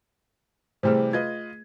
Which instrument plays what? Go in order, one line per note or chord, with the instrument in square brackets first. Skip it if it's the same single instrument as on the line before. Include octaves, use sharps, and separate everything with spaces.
[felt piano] C3 E3 G3 [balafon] A3 G#4 [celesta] C5
[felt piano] F4 B4 D#5 [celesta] G#6